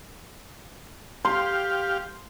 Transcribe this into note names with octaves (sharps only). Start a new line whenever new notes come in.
G4 F5 C6